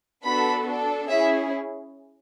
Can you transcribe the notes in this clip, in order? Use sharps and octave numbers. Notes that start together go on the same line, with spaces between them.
B3 D4 F#4 A4 B5
D4 A4
C#4 E4 G#4 E5